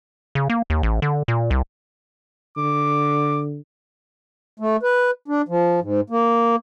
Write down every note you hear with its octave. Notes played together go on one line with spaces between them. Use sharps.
C#3
A#3
D#2
A1
D3
A#2
C2
D3 D6
A3
B4
D4
F3
G#2
A#3